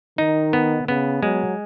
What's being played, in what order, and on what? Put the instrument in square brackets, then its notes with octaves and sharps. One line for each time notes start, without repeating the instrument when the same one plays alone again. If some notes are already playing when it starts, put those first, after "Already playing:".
[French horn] D#3 [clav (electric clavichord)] D#4
[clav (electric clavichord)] B3
[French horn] C#3 [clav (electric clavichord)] B3
[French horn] F#3 [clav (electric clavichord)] G#3